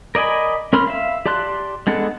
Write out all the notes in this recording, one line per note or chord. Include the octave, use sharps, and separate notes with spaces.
A#4 D5 D#5 G#5 B5
C#4 A#4 B5 C6 F6
E5 F5
G4 D5 A5 C6 F#6
G#3 B3 D4 A4 F#5